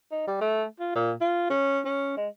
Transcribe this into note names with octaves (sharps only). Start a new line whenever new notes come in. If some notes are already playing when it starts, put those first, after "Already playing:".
D#4
G3
A3
F4
A#2
F4
C#4
C#4
G#3